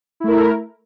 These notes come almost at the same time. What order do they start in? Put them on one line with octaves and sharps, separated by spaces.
E4 A3 A#4